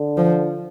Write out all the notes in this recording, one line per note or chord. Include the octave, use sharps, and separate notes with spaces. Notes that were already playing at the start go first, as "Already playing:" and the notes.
Already playing: D3
F3